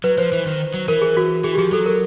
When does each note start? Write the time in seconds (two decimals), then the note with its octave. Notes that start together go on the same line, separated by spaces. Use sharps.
0.04 F#3 B4
0.18 F3 C5
0.32 E3
0.46 D#3
0.74 F#3
0.88 E3 A#4
1.02 G#4
1.17 F#4
1.44 E3 G#4
1.54 G4
1.58 F3 G#4
1.72 F#3 A4
1.86 A#4